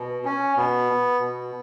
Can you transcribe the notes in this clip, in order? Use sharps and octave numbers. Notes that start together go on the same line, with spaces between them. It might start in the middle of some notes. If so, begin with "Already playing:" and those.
Already playing: B2
C#4
B2 B3
B2